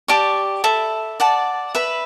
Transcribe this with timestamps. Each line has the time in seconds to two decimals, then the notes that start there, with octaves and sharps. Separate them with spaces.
0.08 G4 D5 A5 C#6
0.64 A4 E5 B5
1.20 D5 F#5 A5
1.75 B4 E5 B5